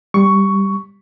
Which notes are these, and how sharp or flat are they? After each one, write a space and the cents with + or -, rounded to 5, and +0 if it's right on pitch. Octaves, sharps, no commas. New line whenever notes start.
G3 +0 C#6 +10